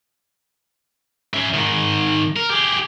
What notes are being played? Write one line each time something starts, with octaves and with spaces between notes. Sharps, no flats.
C#4 E5
G#2 D#3
A#4
G4 G#4